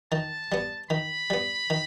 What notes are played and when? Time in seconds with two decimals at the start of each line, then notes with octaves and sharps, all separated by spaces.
0.12 D#3 A5
0.52 G3 B3
0.90 D#3 B5
1.30 G3 B3
1.70 D#3